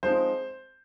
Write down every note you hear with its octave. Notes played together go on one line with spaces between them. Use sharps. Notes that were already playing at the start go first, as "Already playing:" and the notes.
F3 G#3 C4 D#4 C5